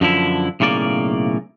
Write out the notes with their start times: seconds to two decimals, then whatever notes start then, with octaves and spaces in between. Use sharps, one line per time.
0.01 F#2 D3 F3 E4
0.60 B1 A2 C#3 A#3 D5